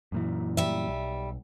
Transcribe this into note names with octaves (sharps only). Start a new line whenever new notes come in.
F#2 A#2 E3
G3 E5
B1